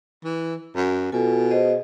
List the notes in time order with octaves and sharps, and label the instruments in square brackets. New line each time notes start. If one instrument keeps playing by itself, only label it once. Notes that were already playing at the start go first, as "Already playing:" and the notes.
[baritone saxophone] E3
F#2
[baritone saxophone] B2 [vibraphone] F4 A4 G#5
[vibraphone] G#4 C5 D#5